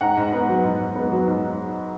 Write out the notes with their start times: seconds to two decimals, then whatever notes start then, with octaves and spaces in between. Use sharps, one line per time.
0.01 G#2 F#5 A#5
0.17 G#2
0.32 B3
0.49 F#3
0.64 G#2
0.79 G#2
0.95 B3
1.12 F#3
1.28 G#2